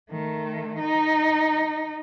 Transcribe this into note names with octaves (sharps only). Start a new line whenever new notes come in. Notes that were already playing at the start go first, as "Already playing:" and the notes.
D#3 A3
D#4